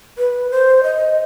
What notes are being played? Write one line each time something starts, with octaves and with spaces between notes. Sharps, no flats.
B4
C5
D#5